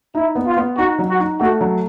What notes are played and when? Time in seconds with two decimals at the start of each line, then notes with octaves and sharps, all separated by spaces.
0.15 D#4 E4
0.35 B3
0.47 F4
0.57 B3
0.77 D#4 F#4
0.99 F#3
1.09 F#4
1.20 D#4
1.40 A3 F#4
1.61 F#3